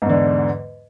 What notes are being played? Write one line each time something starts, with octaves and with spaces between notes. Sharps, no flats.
E2 G#2 D3